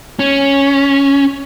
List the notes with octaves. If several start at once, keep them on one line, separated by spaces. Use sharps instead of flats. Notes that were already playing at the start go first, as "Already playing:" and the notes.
C#4